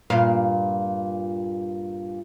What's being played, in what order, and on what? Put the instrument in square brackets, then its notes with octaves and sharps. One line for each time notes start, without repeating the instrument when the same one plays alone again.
[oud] G2 A#2 F5